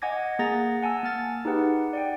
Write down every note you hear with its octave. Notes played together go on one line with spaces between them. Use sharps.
D#5 F#5 G#5 D6 G#6 A#6
A#3 G#4 F#5 A#5 A6 A#6
F#5 G#5 A5 E6
A#3 F6 A6
D#4 G4 G#4 B4 F#5
D5 F#5 G5